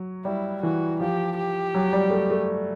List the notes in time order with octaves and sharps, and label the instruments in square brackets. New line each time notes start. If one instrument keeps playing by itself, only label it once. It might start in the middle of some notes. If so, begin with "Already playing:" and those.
Already playing: [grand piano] F#3
[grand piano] G3 [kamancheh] E4
[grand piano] E3 [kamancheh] F#4
[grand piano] F3 [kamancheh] G4
[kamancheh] G4
[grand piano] F#3
G3
A3
A3